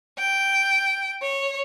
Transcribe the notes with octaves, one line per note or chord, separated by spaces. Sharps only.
G5
C#5